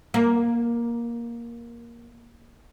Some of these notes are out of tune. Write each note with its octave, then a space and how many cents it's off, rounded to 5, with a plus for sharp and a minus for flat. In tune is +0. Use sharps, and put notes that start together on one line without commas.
A#3 +10